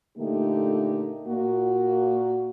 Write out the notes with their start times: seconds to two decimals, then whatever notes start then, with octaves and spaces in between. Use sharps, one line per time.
0.18 A#2 D3 A3 A#3 D#4 G4
1.28 A#2 A#3 F#4